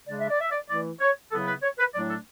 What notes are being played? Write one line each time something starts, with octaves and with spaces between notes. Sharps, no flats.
C#3 G#3 D4 D5
E5
D5
E5
D5
E3 A3 E4 D5
C#5
C#3 F#3 B3 E4 A4
B4
C#5
B4
A2 F#3 A3 D4 D5
A4